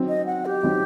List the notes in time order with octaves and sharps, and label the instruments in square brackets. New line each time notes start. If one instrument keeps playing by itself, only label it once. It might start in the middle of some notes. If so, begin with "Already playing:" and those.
Already playing: [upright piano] F#3 C4 D#4
[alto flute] D#5
F#5
G4
[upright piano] F#3 C4 D#4